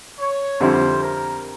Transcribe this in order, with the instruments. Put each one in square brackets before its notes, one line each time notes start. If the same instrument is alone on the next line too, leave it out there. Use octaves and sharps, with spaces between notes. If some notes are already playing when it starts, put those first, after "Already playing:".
[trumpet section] C#5
[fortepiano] F2 D3 G3 C4 E4 [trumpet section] C5
[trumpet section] A#4